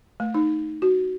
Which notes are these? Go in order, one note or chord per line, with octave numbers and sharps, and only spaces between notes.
A3
D#4
F#4